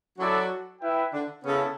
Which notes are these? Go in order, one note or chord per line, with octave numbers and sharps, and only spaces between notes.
F#3 C#4 E4 F#4 A4 D5
E4 B4 E5 G5
D3 D4
C#3 B3 C#4 E4 A4